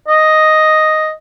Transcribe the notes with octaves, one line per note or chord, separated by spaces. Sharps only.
D#5